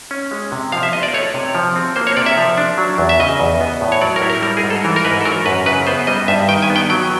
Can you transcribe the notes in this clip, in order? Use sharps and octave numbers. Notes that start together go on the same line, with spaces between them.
C#4
G#3
C3
F3 F5
E5
B3 D#5
D5
A3 C#5
C3
F3
C4
A#3 C5
C#5
C3 D5
E5
F3
D4
F#3
E2
E5
C#3 D#5
E2
B3
A2
C#5
F#3 D5
A#4
E4
A#4
G3 A#4
G#4
G#2
A4
E3 A#4
A#4
G#2 B4
A4
F#3 A#4
F#2 B4
C#3 B4
B3 C5
G3 D#5
G2 E5
D#3 G5
G#5
B3
G5
F#3 G5